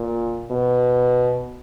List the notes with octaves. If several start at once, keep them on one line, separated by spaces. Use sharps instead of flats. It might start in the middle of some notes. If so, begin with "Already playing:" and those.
Already playing: A#2
B2